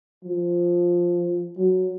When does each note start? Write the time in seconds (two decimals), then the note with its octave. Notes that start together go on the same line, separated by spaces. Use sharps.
0.24 F3
1.57 F#3